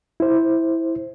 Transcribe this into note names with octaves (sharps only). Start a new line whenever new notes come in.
E4 C5